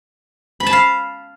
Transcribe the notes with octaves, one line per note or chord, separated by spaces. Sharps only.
B5
A5
F5